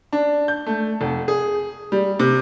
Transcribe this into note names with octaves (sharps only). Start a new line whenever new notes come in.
D4
G6
A3
F1
G#4
G3
C3